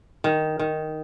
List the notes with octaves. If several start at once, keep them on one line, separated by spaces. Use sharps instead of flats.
D#3
D#3